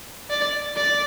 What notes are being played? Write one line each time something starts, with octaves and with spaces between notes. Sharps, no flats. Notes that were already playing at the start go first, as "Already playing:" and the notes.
D5
D5